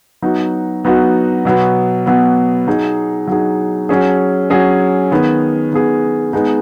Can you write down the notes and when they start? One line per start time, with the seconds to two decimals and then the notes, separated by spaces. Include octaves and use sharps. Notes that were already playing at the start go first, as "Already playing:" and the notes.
0.22 F#3 B3 D#4 F#4
0.84 F#3 B3 D#4 F#4
1.45 B2 F#3 B3
2.06 B2 F#3 B3
2.67 F#3 D#4 G#4
3.27 F#3 D#4 G#4
3.89 F#3 C#4 G#4
4.50 F#3 C#4 G#4
5.11 D#3 B3 G#4
5.71 D#3 B3 G#4
6.33 G#3 B3 D#4 G#4